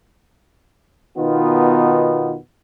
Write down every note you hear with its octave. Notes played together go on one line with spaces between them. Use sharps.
B2 D#3 B3 D#4 F4